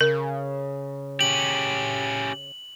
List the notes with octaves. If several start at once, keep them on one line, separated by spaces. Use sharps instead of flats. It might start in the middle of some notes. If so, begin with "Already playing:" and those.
C#3 A#4
C#4 G4 F#7